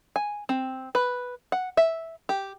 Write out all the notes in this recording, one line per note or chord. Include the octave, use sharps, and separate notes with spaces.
G#5
C4
B4
F#5
E5
G4